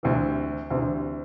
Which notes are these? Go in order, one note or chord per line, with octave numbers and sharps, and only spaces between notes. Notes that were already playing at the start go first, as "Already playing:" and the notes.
D2 C3 E3
D2 C3 E3